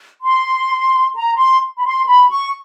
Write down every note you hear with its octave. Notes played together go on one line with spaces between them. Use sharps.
C6
A#5
C6
B5
C6
B5
C#6